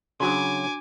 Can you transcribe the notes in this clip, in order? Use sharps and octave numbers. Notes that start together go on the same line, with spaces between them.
C#3 F#3 D4 F#4 G#5 C6 D6